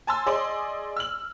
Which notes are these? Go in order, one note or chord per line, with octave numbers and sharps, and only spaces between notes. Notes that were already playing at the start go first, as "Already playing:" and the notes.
G#5 A5 C6 E6
G#4 D5 D#5 C6
E6 F6 F#7